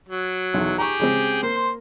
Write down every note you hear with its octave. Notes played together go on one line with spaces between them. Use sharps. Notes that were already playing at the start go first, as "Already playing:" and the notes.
F#3
B1 E2
G4 G#4 G5 A#5 C#6
C#3 G#3 C4
A#3 C5 C6